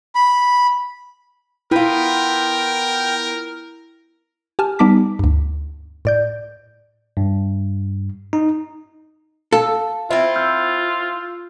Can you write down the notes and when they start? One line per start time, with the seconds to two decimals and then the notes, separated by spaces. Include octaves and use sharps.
0.15 B5
1.71 B3 E4 F4 A#4 G5
4.59 G4 G#5 A5 F6
4.79 G3 B3 D#4 A5 D6 B6
5.19 D2 G2
6.05 A2 D5 G6
7.17 G2
8.33 D#4
9.52 A4 F5
10.11 C4 E4 F4 C5 E5
10.36 E6 F6 G6